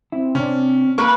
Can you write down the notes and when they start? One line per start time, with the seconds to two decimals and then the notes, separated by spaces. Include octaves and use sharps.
0.12 C4 E4
0.35 C3 C#4 D4
0.98 A#3 B4 C#6